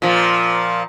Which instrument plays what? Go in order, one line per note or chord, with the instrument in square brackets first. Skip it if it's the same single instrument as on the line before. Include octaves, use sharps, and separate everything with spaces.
[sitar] A#2 F3